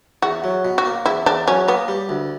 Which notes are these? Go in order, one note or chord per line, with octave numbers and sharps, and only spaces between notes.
E2 F#4
F#3
B2
F#4
A#3
E2 E4
E2 D4
F#3 C#4
A#3 B3
G3
D2